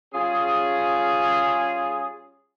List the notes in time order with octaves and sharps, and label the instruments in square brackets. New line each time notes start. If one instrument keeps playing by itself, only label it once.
[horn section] G3 C#4 F4 G#4